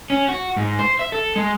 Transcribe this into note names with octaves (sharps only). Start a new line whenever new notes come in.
C#4
F#4
G#2
C5
E5
A4
G#3